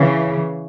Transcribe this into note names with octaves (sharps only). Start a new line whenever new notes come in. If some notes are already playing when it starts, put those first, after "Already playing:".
Already playing: C#3 E3